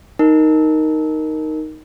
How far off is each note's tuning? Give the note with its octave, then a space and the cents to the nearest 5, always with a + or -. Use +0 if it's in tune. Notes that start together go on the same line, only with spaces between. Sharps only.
D#4 +0 A#4 -5